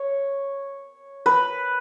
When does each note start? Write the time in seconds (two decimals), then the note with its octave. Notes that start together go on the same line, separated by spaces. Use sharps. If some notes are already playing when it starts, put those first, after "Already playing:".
Already playing: C#5
1.26 B4